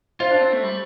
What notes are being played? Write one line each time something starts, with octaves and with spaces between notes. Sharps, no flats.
F4 C5
D4
C4
A3
G3